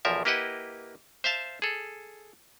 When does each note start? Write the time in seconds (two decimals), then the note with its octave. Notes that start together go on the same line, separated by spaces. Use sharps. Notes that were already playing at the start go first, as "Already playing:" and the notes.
0.05 B1 E2 F3 A#4 E5
0.25 A#3 E4 G4 B4 D#5 F#5
1.24 C5 E5 F5 A5
1.62 G#4 A4